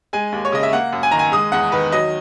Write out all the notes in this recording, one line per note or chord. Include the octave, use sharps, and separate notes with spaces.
G#3 G#5
D#2
C#5
C#3 D#5
E5
A#3 F#5
F#2
G#5
D#3 A#5
G#5
G#3 D#6
E2 F#5
D#3 B4
F#3 D#5